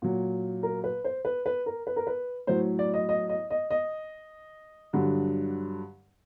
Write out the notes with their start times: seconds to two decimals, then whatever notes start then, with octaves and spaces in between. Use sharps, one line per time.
0.02 A#2 F#3
0.63 A#4
0.84 B4
1.04 C5
1.25 B4
1.46 B4
1.66 A#4
1.87 B4
1.96 A#4
2.07 B4
2.47 A2 F#3 C5
2.79 D5
2.94 D#5
3.09 D#5
3.29 D#5
3.51 D#5
3.71 D#5
4.93 G2 D3 F#3